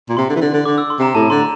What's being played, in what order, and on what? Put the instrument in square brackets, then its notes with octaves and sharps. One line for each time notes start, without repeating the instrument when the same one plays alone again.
[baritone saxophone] A#2
[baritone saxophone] C3 [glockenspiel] C6
[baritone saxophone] D3
E3
D3
D3
[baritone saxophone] D3 [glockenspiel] D6
[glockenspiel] E6
C6
[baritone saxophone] C3 [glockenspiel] A#5
[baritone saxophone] A2 [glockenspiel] A5
[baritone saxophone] D3 [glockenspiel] C6
[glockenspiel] A#5